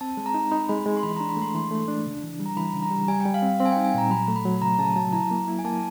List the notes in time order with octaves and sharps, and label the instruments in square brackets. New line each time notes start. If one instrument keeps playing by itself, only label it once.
[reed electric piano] C4 [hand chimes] A5
[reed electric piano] G#3
[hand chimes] A#5
[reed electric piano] D#4
[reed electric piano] D#4 [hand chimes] B5
[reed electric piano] G#3 [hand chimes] B5
[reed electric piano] G#3 [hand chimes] B5
[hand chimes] C6
[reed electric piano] E3 [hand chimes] B5
[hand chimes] A#5
[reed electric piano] D4
[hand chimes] B5
[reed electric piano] A3 [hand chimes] C6
[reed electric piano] E3 [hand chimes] C6
[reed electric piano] A3
D4
C#3
E3
G3
[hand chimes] A#5
[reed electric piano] E3 [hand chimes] B5
[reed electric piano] C#3
[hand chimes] A#5
[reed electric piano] G3
[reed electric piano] G3 [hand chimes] G#5
[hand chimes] G5
[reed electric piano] G3
[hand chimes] F5
[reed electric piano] C4
[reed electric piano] C4 [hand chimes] F5
[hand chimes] G#5
G5
[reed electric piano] D#4
[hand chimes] G#5
[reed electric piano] A#2 [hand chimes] A#5
[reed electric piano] F#3 [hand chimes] B5
[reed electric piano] A3
[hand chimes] B5
[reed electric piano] F#3
[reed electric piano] C#3 [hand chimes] A#5
[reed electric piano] C#3 [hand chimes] A5
[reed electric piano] F#3 [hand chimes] A5
[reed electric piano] E4 [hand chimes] A#5
[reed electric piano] A#3
E4
[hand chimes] G#5
[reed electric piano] A#3 [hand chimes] A5